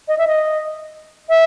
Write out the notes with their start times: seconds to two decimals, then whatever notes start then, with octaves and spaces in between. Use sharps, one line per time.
0.08 D#5
0.18 E5
0.27 D#5
1.29 E5